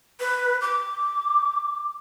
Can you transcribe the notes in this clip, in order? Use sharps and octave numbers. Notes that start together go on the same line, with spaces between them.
B4
D6